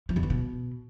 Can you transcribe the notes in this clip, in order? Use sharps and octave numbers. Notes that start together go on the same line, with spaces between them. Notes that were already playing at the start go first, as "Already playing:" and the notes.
F3
F2
E3
B2